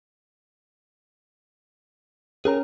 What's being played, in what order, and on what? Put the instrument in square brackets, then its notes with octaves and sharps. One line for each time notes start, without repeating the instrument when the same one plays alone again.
[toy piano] C#4 C#5 G#5 [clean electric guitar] G#4 A#4 A#5